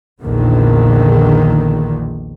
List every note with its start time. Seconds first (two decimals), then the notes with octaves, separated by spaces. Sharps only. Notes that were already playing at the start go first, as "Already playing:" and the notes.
0.21 A#1 E2 A#2 D3 D#3